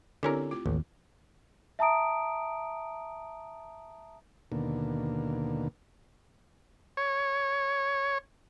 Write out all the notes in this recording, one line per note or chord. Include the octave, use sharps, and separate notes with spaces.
D3 C4 C#4 E4 G4 A#4
A3 F4 D6
A1 D#2
E5 A5 A#5 D#6 D7
D#2 B2 D3 A#3
C#5